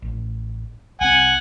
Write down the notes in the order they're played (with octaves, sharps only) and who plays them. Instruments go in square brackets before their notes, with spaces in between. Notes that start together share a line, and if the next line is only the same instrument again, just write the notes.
[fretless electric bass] A1
[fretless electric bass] C2 C4 [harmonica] F#5 G#5